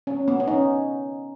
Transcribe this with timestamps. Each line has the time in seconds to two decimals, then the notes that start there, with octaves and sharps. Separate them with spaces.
0.07 C#4
0.28 B3
0.40 C#4
0.48 D#4